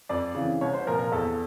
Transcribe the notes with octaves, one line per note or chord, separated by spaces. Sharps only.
F2 D5
C#3 E3
C2 C#5
C5
A#2 F3 A#4
A#4
E2 A4